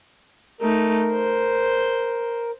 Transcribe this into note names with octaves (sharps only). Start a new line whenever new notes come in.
A3 D#4 A#4
C5